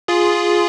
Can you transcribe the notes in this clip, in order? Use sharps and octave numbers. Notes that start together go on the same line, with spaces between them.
F4 G#4